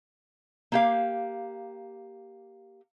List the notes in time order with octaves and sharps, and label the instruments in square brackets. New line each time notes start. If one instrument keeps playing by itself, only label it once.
[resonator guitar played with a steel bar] A#3 G4 F5